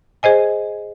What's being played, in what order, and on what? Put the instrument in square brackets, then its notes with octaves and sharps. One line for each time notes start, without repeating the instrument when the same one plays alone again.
[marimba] G#4 C5 D#5 G#5